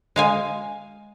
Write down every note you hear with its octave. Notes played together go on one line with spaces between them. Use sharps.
G#3 F5 G#5